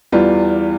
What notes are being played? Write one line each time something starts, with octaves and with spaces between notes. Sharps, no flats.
E2 E3 G3 F4